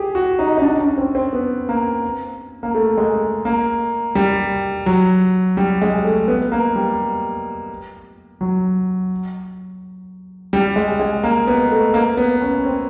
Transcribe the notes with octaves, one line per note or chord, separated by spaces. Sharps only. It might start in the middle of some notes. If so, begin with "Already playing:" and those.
Already playing: G4 G#4
F#4
D#4
D#4
D4
C#4
C4
C4
B3
A#3
A#3
A3
G#3
A#3
G3
F#3
G3
G#3
A3
B3
A#3
G3
F#3
G3
G#3
G#3
A#3
B3
A3
A#3
B3
C#4
C4